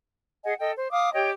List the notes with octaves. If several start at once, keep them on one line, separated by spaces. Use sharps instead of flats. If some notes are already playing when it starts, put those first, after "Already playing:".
G#4 D#5 F#5 G#5
A4 D#5 G5
C5
F5 D6 D#6
G4 C#5 D#5 G5